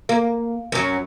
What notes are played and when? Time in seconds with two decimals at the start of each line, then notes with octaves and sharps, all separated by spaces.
0.09 A#3
0.72 F#2 F#3